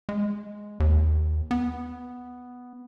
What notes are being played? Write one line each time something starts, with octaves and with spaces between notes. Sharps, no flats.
G#3
D#2
B3